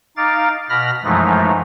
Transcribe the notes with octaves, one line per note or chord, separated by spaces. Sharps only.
D#4 F5 D6 A6
B2 B5 F6 A#6
F#2 E3 F3 G#3 A3 D#4